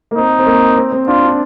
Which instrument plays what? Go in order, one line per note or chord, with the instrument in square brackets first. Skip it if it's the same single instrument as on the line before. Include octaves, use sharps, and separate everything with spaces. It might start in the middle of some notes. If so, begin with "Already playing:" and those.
[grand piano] A#3
[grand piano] C4 [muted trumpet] D#4
[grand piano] C4
A#3
C4
C4
[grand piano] D4 [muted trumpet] F4
[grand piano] D4